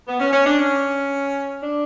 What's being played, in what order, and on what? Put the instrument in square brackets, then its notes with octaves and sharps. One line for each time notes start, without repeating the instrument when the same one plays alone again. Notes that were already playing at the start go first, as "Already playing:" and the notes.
[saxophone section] B3
C#4
C#4
D4
C#4
D4